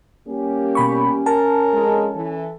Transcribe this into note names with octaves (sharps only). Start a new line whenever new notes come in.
G3 A#3 C#4 G4
B2 B5 C#6
A#4 A5
F2 G#3
E3 E4 A4